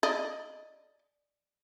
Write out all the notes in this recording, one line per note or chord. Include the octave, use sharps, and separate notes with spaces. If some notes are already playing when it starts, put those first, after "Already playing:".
D5 D#5